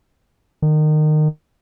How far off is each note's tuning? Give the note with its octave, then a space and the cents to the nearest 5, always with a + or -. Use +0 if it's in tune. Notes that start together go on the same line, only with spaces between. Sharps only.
D#3 -25